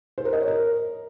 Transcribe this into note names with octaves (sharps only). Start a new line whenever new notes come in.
C5
A#4
D#5
C#5
A#4